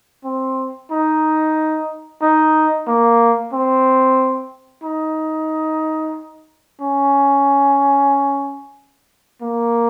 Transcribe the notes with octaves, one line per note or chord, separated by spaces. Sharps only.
C4
D#4
D#4
A#3
C4
D#4
C#4
A#3